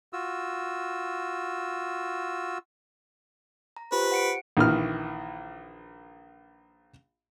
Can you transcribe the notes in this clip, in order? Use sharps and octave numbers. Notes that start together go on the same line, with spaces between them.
F4 F#4 E6
A#5
F4 G4 B4 C5
F#5 C#7 D7
A#1 D#3 E3 F6